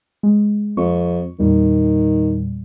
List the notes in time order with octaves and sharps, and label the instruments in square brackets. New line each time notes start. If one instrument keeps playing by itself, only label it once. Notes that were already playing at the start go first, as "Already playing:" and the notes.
[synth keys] G#3
[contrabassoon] F2 [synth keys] C#6
[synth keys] E2 A#2 G3 [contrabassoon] D#3